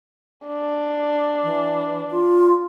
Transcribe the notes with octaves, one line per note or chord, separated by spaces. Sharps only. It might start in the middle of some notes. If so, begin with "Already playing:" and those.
D4
E3
F4